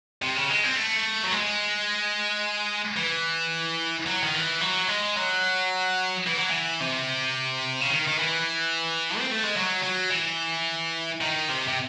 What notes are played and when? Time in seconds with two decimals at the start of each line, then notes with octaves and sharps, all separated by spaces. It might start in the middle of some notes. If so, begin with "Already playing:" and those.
0.22 C3
0.36 C#3
0.50 G#3
0.63 C4
0.76 A3
1.24 F#3
1.32 G#3
2.96 E3
4.06 F#3
4.24 D#3
4.35 E3
4.61 F#3
4.88 G#3
5.17 F#3
6.27 E3
6.37 F#3
6.49 E3
6.81 C3
7.81 C#3
7.91 D#3
8.08 D#3
8.19 E3
9.18 C4
9.31 A3
9.43 G#3
9.56 F#3
9.83 F#3
10.11 E3
11.21 D#3
11.49 C3
11.68 C3